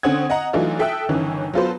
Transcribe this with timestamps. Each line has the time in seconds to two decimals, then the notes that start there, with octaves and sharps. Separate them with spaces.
0.03 D3 C4 C#4 F#5 D#6 G#6
0.30 D#5 F#5 A#5
0.53 E3 F#3 A3 D4 D#4 F4
0.79 A4 E5 G5 D#6 E6 F#6
1.09 G1 D#3 E3 C#4
1.54 F#3 B3 F4 A4 B4 C5